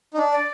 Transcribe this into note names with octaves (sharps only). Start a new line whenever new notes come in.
D#4
D4
D5